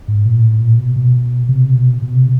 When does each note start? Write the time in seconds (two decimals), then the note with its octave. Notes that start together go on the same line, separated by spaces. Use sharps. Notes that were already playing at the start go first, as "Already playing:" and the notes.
0.08 G#2
0.26 A#2
0.43 A2
0.61 A#2
0.79 B2
0.96 B2
1.49 C3
1.75 B2
2.02 B2
2.15 C3